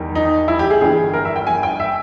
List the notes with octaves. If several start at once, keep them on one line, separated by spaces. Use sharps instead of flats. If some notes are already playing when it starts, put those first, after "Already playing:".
Already playing: E2 D#3 G3
D#4
E4
G4
G#4
G1 G2 E3 G#4
A#4
E5
G5
G#5
G5
E5